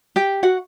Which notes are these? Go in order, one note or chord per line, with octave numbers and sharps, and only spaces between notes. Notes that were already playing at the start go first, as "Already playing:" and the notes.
G4 G5
F#4 F#5